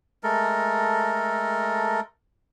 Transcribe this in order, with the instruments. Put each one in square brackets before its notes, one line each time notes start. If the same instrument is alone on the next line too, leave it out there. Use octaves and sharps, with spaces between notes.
[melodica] G#3 A3 A4 A#4